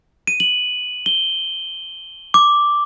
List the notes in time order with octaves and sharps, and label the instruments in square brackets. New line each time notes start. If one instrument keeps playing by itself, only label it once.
[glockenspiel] D#7
F#7
G7
D6